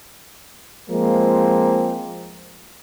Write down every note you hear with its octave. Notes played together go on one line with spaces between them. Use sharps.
F3 G#3 A#3 C4